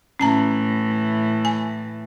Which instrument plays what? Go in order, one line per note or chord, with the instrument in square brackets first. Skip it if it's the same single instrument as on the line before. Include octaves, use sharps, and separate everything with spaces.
[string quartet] A2 E3 [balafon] C#4 A5 A#5
[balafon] G#5